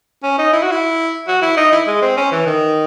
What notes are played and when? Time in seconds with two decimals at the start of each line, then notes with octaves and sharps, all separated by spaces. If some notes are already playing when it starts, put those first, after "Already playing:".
0.23 C#4
0.38 D#4
0.53 E4
0.63 F#4
0.71 E4
1.28 F#4
1.42 E4
1.57 D#4
1.72 E4
1.87 G#3
2.02 C4
2.17 C#4
2.32 E3
2.46 D#3